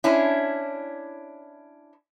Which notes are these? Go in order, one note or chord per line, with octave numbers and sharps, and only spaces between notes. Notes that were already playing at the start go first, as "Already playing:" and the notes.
C#4 D4 E4